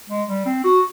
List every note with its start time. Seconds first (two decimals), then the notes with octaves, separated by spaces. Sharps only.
0.09 G#3
0.28 G3
0.46 C4
0.64 F#4